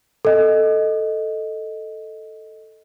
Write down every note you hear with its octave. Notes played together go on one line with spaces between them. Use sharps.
A4 D#5